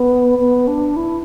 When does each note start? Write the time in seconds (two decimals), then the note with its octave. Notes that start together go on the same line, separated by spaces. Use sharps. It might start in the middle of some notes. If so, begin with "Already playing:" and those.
Already playing: B3
0.39 B3
0.68 D4
0.96 E4